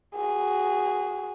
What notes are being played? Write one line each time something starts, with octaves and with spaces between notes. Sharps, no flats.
F#4 G#4